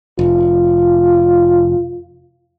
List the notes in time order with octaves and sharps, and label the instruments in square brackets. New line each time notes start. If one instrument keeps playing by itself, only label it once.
[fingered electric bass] F1 [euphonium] F4